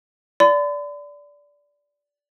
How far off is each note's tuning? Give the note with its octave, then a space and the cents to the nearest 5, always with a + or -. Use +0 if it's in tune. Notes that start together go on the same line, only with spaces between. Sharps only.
D5 -15 B5 +45